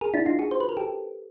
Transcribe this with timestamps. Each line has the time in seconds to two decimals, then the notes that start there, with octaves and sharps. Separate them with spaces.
0.01 G#4 A#4
0.14 D4 E4
0.26 D#4 F4
0.39 F#4 G#4
0.51 C5
0.60 B4
0.69 A#4
0.77 G4 A4